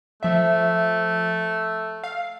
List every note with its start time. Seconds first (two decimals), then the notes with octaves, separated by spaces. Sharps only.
0.23 F3 A3 E5
2.04 F5